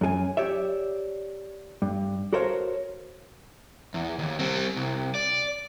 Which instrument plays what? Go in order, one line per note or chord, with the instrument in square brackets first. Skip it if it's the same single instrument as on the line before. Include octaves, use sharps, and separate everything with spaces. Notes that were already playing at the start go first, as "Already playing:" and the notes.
[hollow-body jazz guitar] F#2 G#4 G#5
G4 C#5 D5 E5
G2
F#4 A4 A#4 C5 C#5 F5
[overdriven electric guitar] E2
D#2
G3 C4
C2
D5